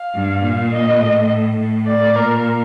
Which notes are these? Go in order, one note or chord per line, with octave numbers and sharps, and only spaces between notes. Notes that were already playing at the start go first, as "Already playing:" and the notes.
Already playing: F5
G2
A#2
D#5
A2
A2
D5
A#2 A#4